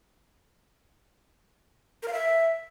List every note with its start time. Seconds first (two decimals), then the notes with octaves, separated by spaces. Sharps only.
2.02 A#4
2.08 F5
2.13 E5